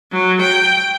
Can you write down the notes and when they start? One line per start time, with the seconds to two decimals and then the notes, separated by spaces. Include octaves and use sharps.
0.12 F#3
0.42 G5